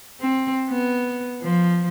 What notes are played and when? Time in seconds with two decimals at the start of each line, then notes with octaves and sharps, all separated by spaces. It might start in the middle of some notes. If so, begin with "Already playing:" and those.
0.21 C4
0.69 B3
1.42 F3